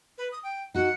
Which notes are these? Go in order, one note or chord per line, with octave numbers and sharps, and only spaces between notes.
B4
D#6
G5
D#4 F#4 F#5